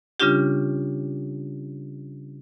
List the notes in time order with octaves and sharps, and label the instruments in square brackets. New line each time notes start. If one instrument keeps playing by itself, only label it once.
[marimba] C#3 G3 C#4 D4 F4 G4